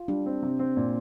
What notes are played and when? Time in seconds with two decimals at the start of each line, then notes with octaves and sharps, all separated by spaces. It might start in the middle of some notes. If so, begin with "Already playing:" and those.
Already playing: F4
0.08 G3 D4
0.26 C4
0.42 C3
0.59 C4
0.77 A#2